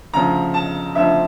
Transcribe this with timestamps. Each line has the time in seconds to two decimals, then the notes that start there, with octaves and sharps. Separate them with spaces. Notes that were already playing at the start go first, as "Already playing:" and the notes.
0.14 D2 C#3 F3 A#5
0.54 A5
0.95 D2 C#3 F3 E5